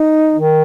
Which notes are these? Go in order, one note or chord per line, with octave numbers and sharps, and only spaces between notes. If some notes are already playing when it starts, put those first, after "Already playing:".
Already playing: D#4
D#3